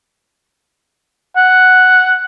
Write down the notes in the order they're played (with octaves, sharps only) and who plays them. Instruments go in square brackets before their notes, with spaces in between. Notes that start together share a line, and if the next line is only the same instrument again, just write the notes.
[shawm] F#5